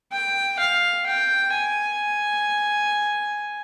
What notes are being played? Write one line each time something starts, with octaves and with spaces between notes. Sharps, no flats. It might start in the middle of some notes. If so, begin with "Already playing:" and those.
G5
F5
G5
G#5